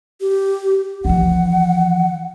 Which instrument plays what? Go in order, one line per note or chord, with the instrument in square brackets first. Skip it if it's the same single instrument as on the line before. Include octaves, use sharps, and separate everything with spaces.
[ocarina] G4
[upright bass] E3 F3 [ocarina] F#5